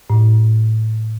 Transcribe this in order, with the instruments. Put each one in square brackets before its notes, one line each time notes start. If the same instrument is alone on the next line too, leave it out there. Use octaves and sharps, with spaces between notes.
[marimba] A2